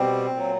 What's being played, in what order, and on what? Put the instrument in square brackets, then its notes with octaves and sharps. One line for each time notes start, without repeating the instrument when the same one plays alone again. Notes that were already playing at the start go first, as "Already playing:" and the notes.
Already playing: [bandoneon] B2 G3 C4
A#2 F#3